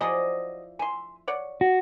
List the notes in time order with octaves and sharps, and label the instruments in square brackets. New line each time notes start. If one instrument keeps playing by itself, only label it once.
[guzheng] F3 E4 D5 [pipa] F#3 G#4 D#5
[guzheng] E5 [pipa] G#5 C6
[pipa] C#5 D5 F#5
[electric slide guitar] F#4